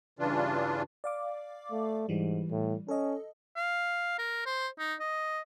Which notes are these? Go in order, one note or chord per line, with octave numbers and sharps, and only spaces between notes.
G2 C#3 E3 D4 F4
D5 F5 D6
A3
G#2 E3 G3
A2
C#4 A4 D#5
F5
A#4
C5
D#4
D#5